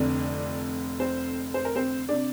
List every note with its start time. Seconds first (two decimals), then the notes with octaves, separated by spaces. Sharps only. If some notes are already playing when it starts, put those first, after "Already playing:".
Already playing: F1 F2 D3 D4 D5
1.00 C4 C5
1.54 C5
1.65 A#4
1.75 C4 C5
2.09 C3 D4 D5